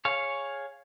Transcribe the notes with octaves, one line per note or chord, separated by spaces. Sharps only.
G#4 C#5 F5